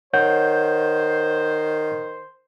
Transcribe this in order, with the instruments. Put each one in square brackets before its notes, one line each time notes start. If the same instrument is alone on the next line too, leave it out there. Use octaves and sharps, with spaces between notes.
[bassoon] D#3 [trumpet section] C5 [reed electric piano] C#5 F#5 G6